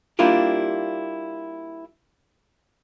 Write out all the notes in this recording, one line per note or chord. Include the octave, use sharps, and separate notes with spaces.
G3 A#3 D4 E4 F4 G4